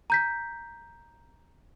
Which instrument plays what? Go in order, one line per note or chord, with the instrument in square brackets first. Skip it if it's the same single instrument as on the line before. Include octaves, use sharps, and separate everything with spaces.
[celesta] A#5 G6 B6